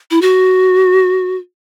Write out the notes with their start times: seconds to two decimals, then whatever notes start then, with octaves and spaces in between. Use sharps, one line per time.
0.11 E4
0.21 F#4